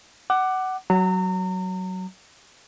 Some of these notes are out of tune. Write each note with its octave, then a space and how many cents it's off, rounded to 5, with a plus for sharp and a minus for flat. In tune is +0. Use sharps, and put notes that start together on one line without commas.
F#5 +20 D6 +10
F#3 +15 A#5 -30